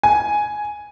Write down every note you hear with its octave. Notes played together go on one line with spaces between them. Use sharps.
G#5